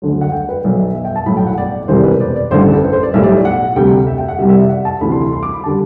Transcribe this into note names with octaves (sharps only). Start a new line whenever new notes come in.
D2 D3 F#3
F#5
G5
B4
B1 B2 F#3 D5
E5
E5
G5
A5
B1 A2 F#3 B5
G5
F#5
D5
D5
E1 E2 C3 G3 C5
B4
D5
D5
A1 G2 D3 C5
A4
A4
B4
C5
D5
B1 A2 G3 E5
D5
F#5
D2 C3 G3 G5
E5
G5
F#5
C2 C3 G3 E5
E5
D5
F#5
A5
D2 C3 E3 B5
C6
C6
C6
D6
B5
D3 G3 A5